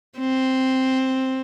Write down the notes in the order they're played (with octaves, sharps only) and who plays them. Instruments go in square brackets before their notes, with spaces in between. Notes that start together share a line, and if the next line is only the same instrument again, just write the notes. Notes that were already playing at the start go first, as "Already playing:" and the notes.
[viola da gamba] C4